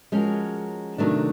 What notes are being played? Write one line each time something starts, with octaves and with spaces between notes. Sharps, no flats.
F3 G#3 C#4 F#4 A#4
C3 D#3 F#3 A3 D4